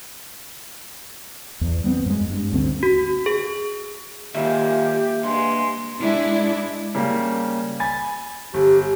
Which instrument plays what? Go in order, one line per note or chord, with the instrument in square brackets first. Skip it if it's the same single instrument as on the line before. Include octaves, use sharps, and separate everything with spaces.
[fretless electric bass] E2
G3 B3 C4
F#2 G#3
G2
D2 C4 C#4
[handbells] F#4
G#4
[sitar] D#2 A#2 G#3 [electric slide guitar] A#3 E5 [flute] G4
[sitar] G2 G#3 [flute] C6
[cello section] G#3 D4 E4
[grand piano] C#3 G3 A#3
G#5 B5 A6
[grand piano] G1 [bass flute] G4